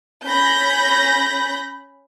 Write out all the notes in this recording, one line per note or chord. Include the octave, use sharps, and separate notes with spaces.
C#4 B5 G6 A#6